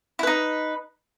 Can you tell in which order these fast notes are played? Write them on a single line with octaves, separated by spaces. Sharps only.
E4 B4 D#4